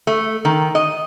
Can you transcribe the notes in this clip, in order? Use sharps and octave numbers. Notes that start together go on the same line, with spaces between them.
A3
D#3
D#5